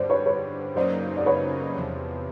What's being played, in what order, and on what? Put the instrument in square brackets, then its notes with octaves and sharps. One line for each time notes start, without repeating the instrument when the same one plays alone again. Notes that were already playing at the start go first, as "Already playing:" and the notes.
Already playing: [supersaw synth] G2 D3 G3 [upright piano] C5 D5
[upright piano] B4 C#5
B4 C#5
[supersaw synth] F#2 C#3 F#3 A#3 D#4 [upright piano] C5 D5
[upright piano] D5
B4 C#5
[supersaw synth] E2 C3 F3